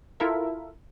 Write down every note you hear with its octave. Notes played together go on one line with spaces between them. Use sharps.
E4 F4 A4 A#4 E5